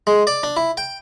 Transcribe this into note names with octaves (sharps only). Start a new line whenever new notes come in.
G#3
D5
D4
E4
G5